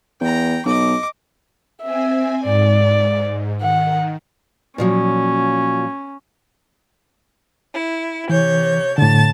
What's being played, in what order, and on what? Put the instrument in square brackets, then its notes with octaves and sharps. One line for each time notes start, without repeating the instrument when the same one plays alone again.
[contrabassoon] E2 [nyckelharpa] G5 A#5
[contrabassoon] B1 [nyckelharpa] D#5 D6
[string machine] C4 G#5 [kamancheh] E5
[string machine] G#2 [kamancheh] D5
[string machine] D#3 [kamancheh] F#5
[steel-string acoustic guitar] A#2 F3 F#3 [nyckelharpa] C#4
[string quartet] E4
[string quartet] C3 C#5 G6 [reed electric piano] E3
[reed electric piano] A2 D3 [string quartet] A5 A6